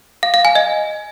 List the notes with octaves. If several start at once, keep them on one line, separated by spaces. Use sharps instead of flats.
F5
F5
G#5
D#5